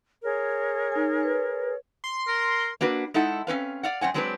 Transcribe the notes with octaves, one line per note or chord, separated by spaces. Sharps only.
G#4 A#4 C#5
D#4 G#5
B4
C6
A#4
A#3 D4 F#4 B4
G#3 D#4 E4 A4 F#5
C4 C#4 B4 F5
D5 F5 F#5
F#2 C4 F#5 G#5
F#3 G#3 C4 D4 A4 B4